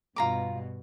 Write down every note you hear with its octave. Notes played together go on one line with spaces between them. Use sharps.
G2 B2 F4 A#5 D6